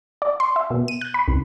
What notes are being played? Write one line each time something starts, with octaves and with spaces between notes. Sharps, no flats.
D5
C6
E5
B2
D#7
F#6
B5
C#2